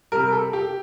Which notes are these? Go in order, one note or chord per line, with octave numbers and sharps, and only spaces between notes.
C3 G3 A#4
A4
G4